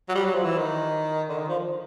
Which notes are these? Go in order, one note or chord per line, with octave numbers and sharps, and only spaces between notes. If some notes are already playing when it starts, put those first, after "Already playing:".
F#3
G3
F#3
F3
E3
D#3
D3
D#3
F3